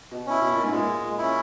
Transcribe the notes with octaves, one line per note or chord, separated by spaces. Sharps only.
B2
C#4 E4
B2
A#2
G#2
A#2 G#3
C#4 E4